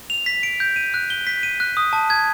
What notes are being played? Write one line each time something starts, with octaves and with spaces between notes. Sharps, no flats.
F7
B6
D7
G6
D#7
F#6
G7
B6
D#7
F#6
D#6
A5
G#6